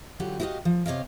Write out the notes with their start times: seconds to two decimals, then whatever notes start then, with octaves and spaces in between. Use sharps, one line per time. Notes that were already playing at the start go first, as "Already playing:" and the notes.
0.20 D3 F#3 F4 G4 F#5
0.40 E4 F#4 G4 B4 D#5 F5
0.65 F3
0.86 C3 C#5 D#5 F5